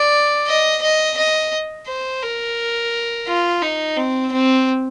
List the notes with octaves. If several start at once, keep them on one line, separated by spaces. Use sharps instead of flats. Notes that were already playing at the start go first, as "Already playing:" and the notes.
Already playing: D5
D#5
D#5
D#5
C5
A#4
F4
D#4
C4
C4